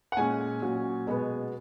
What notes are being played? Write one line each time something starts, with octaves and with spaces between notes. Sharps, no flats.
F#5
A#2 G#3 C#4 G#5
A#2 F#3 C#4
B2 G#3 B3